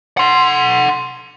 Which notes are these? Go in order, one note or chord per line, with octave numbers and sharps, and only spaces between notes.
F#5 C6